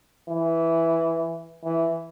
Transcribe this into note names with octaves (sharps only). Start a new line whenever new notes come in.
E3
E3